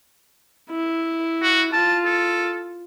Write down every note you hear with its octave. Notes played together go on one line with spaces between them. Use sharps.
E4
F#4
F4 A5
A4